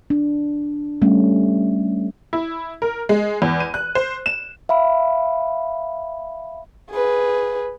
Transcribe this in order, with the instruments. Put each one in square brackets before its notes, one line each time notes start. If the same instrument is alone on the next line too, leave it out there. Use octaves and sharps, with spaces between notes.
[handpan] D4
G3 A3 C#4
[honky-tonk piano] E4
A#4
G#3
E2
D#7
F#6
C5
E7
[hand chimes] E5 F5 B5
[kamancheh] G#4 B4